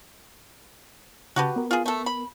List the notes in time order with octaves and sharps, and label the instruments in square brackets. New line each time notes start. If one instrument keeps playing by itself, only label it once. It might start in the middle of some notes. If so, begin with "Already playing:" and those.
[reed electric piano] C#3 A5 [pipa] F#4 G4 B4
[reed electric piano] B3 A#4
[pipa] F4 G#4
A3 A4
B5